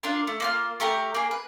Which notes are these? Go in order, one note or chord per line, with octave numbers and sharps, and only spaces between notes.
D4 F4 A#4
A3
A#3 F4 F6
A3 G4 A#4 A#5
A#3 G#4
B4